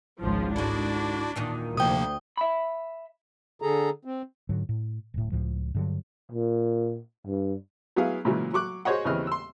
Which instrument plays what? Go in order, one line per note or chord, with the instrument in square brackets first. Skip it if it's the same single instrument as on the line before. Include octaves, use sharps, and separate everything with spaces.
[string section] G#1 C#2 F3
[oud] G#2 D3 [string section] D4 [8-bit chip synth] E4 F#4
[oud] E2 A#2 D#3
[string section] D2 [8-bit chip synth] C3 F3 A#3 [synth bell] G5 D#6
[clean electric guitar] E5 B5
[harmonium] D3 G#4 A4 A#5
C4
[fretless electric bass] G#2 D3 F#3
A2
D1 A2
C#2 A2 F3
G2 D3 F#3
[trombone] A#2
G2
[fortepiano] F#3 B3 E4 G#4 F5
A#2 C#3 E3 F#3 G#3
F#3 C#6 D6 F#6
F#4 G#4 C5 C#5 D#5 F#5
D#2 C#3 E3 C4 D#5 F6
C6 E6